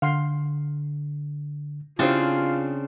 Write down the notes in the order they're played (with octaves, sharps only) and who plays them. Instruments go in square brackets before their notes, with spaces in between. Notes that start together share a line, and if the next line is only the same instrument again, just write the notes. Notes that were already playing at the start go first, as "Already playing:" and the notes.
[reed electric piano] D3 [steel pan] F5 F#5 C6
[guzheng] C#3 C4 D4 [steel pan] E4 G4 C5 [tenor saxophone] F4